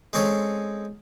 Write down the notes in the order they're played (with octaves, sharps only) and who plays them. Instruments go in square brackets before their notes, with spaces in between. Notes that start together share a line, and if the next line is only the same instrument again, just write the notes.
[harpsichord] G#3 C4 C#4 G#4 A4 C#5